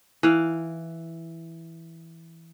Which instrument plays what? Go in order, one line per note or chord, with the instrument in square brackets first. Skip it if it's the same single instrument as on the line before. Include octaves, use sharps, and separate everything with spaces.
[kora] E3 F5